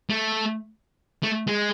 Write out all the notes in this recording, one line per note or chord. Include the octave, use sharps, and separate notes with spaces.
A3
A3
G#3